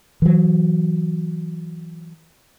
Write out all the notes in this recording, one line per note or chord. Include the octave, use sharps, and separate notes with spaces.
E3 F#3